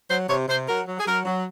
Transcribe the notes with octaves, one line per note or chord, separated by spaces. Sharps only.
F#3 C5
C3 C#5
C3 C5
F#3 A#4
F#3
G#4
F#3 A#4
F#3